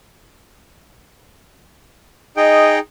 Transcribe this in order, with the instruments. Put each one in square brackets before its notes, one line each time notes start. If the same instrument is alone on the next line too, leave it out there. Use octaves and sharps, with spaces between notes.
[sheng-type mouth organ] D#4 G#4 G5 [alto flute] D#5